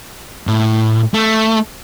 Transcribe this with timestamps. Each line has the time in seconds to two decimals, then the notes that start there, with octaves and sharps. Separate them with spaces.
0.47 A2
1.14 A3